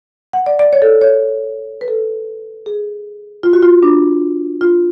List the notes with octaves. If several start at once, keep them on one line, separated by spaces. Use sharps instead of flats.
F#5
D5
D5
C#5
A4
C#5
B4
A4
G#4
F4
F#4
F4
D4
F4